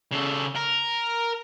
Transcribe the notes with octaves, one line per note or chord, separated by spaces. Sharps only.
C#3 A4
A#4